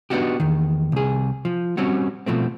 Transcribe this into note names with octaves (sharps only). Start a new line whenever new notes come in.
B3 C4 D4 D#4 F#4 G4
E2 D#3
C2 G#4
F3
G3 C4 C#4 F#4
B2 F3 A3 C4